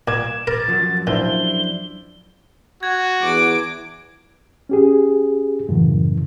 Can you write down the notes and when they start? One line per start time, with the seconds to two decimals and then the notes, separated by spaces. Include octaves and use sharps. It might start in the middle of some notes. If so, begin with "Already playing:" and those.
0.08 A#2 D6 G#6 E7
0.47 A#4 A6
0.68 F#2 F3 F#3
1.07 A#2 D4 E4 C5 G7
2.83 F#4 G#6
3.22 E2 D6 D7
4.69 C#4 G4 G#4
5.69 F#2 A2 C#3 E3